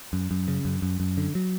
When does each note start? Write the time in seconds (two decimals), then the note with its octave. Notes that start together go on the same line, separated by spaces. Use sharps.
0.13 F#2
0.31 F#2
0.48 C#3
0.65 F#2
0.82 F#2
1.00 F#2
1.17 D3
1.35 F#3